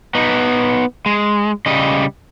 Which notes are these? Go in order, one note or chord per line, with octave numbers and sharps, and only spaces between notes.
B3 D#4
G#3
C#3 G3 D#5